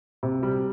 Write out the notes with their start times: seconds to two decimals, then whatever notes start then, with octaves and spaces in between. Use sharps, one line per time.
0.23 C3
0.43 G3